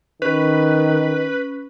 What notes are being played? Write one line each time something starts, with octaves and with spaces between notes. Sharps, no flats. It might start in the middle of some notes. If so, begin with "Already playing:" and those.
D#3 C#4 B4